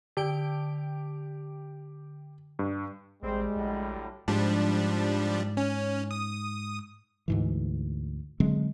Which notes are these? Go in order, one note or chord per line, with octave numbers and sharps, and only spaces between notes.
D3 G4 G5 D7
G2
A1 G3 G#3 C4
A#1 A2 D3 F#3
G#2 F3 G3 D4
C#4
D#6
D2 G#2 E3
D3 F#3 G#3 C4